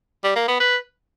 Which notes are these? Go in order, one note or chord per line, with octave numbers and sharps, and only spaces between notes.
G3
A#3
B3
B4